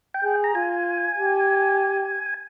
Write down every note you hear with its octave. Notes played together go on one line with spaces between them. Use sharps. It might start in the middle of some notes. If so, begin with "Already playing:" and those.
G5
G#4
A#5
F4 G#5
G4